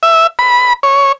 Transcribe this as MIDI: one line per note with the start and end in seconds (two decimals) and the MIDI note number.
0.03 0.27 76
0.39 0.73 83
0.83 1.12 73